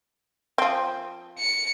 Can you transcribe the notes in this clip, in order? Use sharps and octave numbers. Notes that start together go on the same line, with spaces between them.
F3 C4
C#7